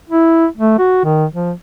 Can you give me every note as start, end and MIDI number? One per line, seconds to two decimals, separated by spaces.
0.09 0.46 64
0.57 0.78 57
0.78 1.02 66
1.04 1.26 51
1.33 1.52 53